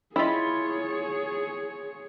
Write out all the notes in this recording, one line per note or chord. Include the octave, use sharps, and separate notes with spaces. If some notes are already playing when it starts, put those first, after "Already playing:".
E4 F4 G#4 C#5 D#5 B5